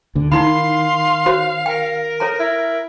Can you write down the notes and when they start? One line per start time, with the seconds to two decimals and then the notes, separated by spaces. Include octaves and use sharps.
0.15 D2 D3
0.32 D#3 D#4 E4 F5 B5 C6
1.26 F#4 C5 C#5
1.66 A#4 G5
2.20 A4 C#5 A#5
2.40 E4